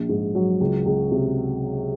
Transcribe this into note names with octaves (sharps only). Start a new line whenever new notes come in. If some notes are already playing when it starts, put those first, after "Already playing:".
Already playing: A#1
G#2
F#3
C#2
C#2
C3